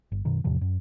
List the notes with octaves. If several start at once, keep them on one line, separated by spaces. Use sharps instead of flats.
G1
F#2 B2 D#3
E2 A2 C3 F3
F#2